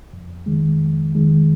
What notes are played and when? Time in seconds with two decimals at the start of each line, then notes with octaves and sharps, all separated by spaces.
0.13 F2
0.46 D#3 G#3
0.80 F2
1.15 D#3 G#3